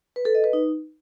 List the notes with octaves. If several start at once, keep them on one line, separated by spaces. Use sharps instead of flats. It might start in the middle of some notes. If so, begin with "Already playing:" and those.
B4
A4
D#5
B4
D#4